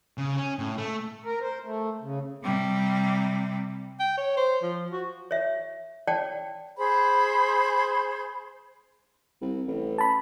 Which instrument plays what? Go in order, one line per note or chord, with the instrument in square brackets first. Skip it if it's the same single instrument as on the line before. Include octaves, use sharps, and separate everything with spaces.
[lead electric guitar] C#3
C#4
A2
A3
[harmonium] A#4
C5
A3
C#3
[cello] C3 G3
[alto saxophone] G5
C#5
C5
F3
F#4
[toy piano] C#5 E5
C#5 D5 F#5 G5 A5
[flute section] G#4 C5 B5
[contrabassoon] C2
A1
[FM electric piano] A5 B5